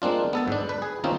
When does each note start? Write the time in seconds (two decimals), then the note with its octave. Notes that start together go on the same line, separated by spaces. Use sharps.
0.02 G#3 A#3 C4 D4 F4
0.33 B3 A4 A5
0.48 G#2 D4
0.69 B4
0.82 G#4
1.04 D#3 A#3 C4 C#4 D#4 F4